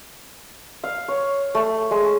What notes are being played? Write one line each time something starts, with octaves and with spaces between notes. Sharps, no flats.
F5
C#5
A3
G#3